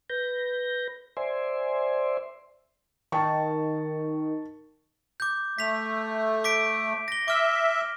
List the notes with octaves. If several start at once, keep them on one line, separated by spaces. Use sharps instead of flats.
B4 G6 A#6
C5 D5 E5 G#5 C6
D#3 A5 C#6
D6 G6
A3 B6 F7
D6 B6 D7
A#6 G7
E5 D6 F6